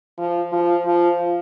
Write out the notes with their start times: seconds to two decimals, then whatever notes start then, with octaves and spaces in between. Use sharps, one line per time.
0.18 F3
0.52 F3
0.86 F3